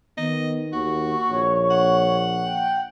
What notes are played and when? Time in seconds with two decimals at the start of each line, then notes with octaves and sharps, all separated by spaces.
0.18 D#3 B3 D#5
0.73 D#2 F#4 C#6
1.30 A#1 C#5
1.70 F#5
2.44 G5